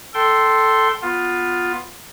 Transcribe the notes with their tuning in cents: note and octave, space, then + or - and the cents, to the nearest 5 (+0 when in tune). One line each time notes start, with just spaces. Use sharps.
A4 +0 G5 -20 C6 +0
B3 +0 F4 +10